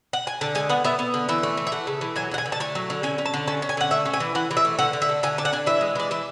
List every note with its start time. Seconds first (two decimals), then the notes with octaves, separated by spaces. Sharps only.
0.13 F#5
0.27 G#5
0.41 D3 A5
0.55 G#3 G#5
0.69 B3 F#5
0.84 B3 E5
0.99 B3
1.14 D3
1.29 E3 E5
1.43 A3
1.57 E3
1.67 E5
1.72 A3 F#5
1.87 C#3
2.01 E3
2.16 F#3 G#5
2.31 D3 F#5
2.38 G#5
2.46 D3
2.52 A5
2.60 A3 G#5
2.75 F#3
2.90 D3
3.03 C#4 G#5
3.18 C#4
3.26 A5
3.34 D3
3.48 C#4 A5
3.62 C#4
3.69 G#5
3.77 D3 F#5
3.91 A3 E5
4.06 C#4
4.13 G#5
4.20 E3
4.35 E3 F#5
4.51 E3
4.57 E5
4.65 A3
4.79 D3 F#5
4.93 D3
5.02 E5
5.09 A3
5.23 D3 G#5
5.38 D4 A5
5.45 F#5
5.53 D4 G#5
5.66 E3 E5
5.81 G#3
5.95 E3 D5
6.11 E3 E5